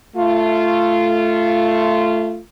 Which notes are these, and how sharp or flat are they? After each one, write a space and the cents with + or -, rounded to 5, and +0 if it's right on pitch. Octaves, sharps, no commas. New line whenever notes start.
A3 +0 F4 -15